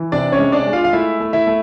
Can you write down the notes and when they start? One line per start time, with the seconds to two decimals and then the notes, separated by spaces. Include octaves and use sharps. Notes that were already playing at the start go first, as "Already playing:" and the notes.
Already playing: E3
0.12 C3 D4 D5
0.32 C#4 C#5
0.39 G#3
0.52 D4 D5
0.67 G#3
0.73 F4 F5
0.84 F5
0.93 A3 E4 E5
1.20 A3
1.33 E4 E5
1.47 A3